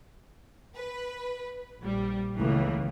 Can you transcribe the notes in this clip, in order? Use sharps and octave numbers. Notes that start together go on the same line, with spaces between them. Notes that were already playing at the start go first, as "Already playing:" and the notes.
B4
A#1 G3
C#2 A2 D#3 E3 A3 A#3